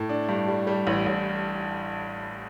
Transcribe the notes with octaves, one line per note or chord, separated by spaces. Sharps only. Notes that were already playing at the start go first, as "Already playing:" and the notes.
Already playing: A2
D4
G2
G3
G3
A1
A1